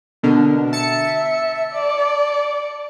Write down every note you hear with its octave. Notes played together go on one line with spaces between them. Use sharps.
B2 D3 A#4
E5 A5 C#7
D5